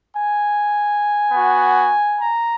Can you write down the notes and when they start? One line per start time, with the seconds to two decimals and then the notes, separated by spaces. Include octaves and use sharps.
0.13 G#5
1.31 B3 F#4
2.20 A#5